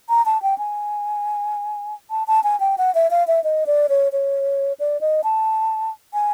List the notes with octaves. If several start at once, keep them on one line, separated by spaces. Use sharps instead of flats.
A#5
A5
G5
G#5
A5
A5
G#5
G5
F#5
E5
F5
E5
D#5
D5
C#5
C#5
D5
D#5
A5
G#5